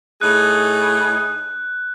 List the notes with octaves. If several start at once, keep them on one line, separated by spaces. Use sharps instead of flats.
A2 D#4 G#4 F#6